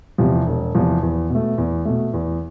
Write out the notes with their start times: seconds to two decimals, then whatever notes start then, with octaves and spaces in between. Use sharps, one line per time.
0.18 E2 C3 F3
0.46 E1
0.74 E2 C3 F3
1.03 E2
1.29 B2
1.35 A3
1.58 E2
1.85 B2 A3
2.14 E2